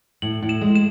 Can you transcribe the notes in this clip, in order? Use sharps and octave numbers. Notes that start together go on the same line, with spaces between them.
A2 F#7
A2
E7
G#3
E7